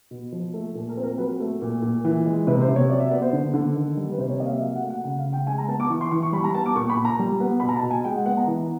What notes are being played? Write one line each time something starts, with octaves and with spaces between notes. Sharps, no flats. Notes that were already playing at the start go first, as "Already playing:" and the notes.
B2
F3
A3
A#2 A4
A#4
C4
A#4
F#3 B4
A3
A#2
A#2
E3
G#3
C3 B4
C5
C3
C#5
F#3 D5
E5
B3 D5
C5
D3
D3
D#3
G3
B4
C3 C5
C#5
A#3 D#5
F5
E5
F#3 F5
F#5
A3
F#5
C#3 F#5
F5
C#3
G5
G#3 G#5
A#5
B3 A5
D6
E3 C#6
C6
E3 C#6
C#6
G3 B5
A#5
B3 A5
D6
A#2 C#6
B5
A#2
A#5
G3
B3
B2 B5
A#5
A5
B2
G#5
G#3 G5
F#5
B3 F#5
A#5
E3